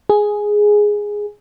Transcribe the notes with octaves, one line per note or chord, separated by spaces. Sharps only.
G#4